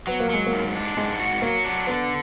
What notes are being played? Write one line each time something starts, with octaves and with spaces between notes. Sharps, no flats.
F#3 B3
A#3
F#3 G#3
A#3
G#2
D4
G#2 G#3
F#4
F#3 A#3
D4
D3 B3